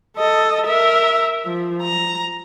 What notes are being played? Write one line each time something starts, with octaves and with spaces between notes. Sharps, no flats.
A4 D#5
A#4 E5
F3
A#5